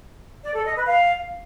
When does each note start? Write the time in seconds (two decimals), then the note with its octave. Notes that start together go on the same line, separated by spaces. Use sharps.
0.44 D5
0.54 A4
0.65 D#5
0.76 B4
0.87 F5